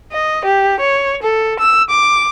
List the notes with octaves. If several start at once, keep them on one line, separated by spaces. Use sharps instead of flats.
D#5
G4
C#5
A4
E6
D6